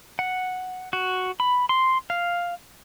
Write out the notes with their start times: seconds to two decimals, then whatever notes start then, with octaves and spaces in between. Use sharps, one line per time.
0.19 F#5
0.93 F#4
1.40 B5
1.69 C6
2.10 F5